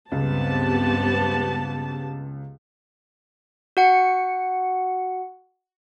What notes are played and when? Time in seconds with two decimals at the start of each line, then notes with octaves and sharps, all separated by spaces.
0.12 C#2 G2 B3 C4 G4 A5
3.77 F#4 F#5 C#7